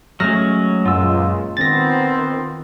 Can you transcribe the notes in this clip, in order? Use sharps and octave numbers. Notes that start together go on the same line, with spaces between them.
F#3 G#3 A3 C#4 F6 A#6
C#2 F#2 A#2 G#3 F4 E6
D#3 B3 C4 A6 A#6